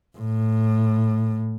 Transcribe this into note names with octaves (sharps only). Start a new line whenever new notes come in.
A2